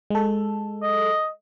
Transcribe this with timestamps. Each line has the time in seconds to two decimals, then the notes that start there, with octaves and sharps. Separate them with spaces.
0.10 G#3 A4
0.82 D#5